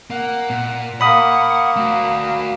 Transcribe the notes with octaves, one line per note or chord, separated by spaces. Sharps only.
A#3 F#5
A#2
A#3 F#5 B5 D#6
A3 F#4